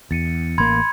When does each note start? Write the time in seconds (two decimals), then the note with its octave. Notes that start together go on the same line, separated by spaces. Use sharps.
0.11 E2 A6 C#7 D#7
0.58 A1 A#3 B5 C6 G#6